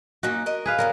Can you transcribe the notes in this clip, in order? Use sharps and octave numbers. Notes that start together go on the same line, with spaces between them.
A#3 C#4 D#4 F#4
A#4 D#5
G#4 B4 F5
D3 F#3 B3 A#4